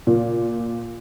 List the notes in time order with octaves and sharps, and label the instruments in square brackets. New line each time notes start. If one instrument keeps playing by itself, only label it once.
[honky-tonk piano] A#2